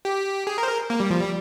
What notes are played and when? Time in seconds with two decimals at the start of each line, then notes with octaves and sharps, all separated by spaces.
0.05 G4
0.47 G#4
0.58 A#4
0.63 C5
0.68 A#4
0.90 A#3
1.00 G3
1.11 F3
1.21 G3